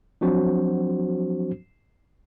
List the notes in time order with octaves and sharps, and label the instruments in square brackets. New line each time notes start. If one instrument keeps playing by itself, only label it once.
[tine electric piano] F3 F#3 C4 D4 F#4 C5